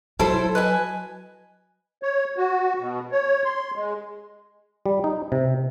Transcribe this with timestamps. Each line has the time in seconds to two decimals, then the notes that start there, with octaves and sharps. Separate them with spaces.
0.20 F#3 E4 A4 C5
0.55 B4 D#5 G#5
2.03 C#5
2.37 F#4
2.79 B2
3.12 C#5
3.45 C6
3.76 G#3
4.86 G3
5.04 D#4
5.32 C3